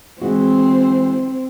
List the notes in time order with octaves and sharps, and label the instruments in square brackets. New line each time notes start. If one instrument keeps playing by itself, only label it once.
[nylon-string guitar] E3 G#3 F#4 [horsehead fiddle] C4